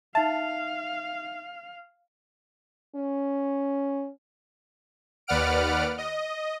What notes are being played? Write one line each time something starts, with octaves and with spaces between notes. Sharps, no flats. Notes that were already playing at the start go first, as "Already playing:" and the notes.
D#4 E5 F5 A5
C#4
D#2 B4 D5 F#5 F6 D7
D#5